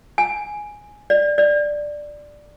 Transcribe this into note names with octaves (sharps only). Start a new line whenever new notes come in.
G#5
D5
D5